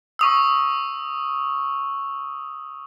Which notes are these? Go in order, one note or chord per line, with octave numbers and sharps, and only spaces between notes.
C#6 D#6 E6